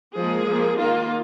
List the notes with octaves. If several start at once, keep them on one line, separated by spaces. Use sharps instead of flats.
F3 G#3 A#3 G#4
F3 A#3
D#3 A#3 F4